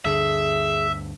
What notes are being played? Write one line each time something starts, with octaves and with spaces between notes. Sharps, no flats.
D2 G2 D3 G#4 E5